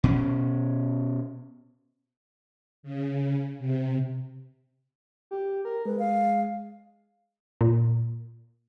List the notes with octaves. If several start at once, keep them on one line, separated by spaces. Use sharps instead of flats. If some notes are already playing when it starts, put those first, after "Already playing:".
B2 C#4
C#3
C3
G4
A#4
G#3 B4
F5
A#2